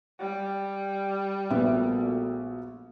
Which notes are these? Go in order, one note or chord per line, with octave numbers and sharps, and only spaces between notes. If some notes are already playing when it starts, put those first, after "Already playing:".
G3
A#1 A#2 A3 B3 F#4 E5